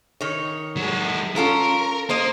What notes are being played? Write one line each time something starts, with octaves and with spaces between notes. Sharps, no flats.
D#3 C#5
F#3 G#3
C#4 F4 A4 A#4
A#3 C5 D#5